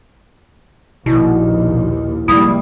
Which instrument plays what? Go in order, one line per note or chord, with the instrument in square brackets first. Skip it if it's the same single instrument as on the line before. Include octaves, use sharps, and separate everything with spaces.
[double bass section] A#1 D#2 [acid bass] B2 [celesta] E4
[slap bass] F1 G#3 A#3 [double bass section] G3 [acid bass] E4 [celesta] D#6